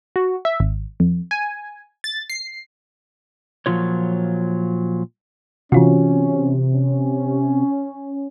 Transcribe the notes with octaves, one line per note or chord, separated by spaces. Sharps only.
F#4
E5
G#1
F2
G#5
A6
C7
A#2 F3 F#3 F4 C#5
C3 E3 C#4 F4 F#4
C#4